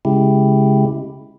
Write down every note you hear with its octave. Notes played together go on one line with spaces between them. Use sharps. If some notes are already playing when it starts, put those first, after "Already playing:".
C#3 G#3 E4 G4